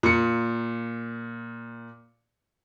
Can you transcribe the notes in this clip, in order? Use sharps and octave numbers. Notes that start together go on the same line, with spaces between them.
A#2 C#7